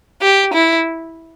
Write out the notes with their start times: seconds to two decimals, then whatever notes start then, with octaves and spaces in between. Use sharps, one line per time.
0.22 G4
0.53 E4